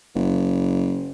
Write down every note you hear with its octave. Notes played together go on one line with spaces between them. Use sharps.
F#1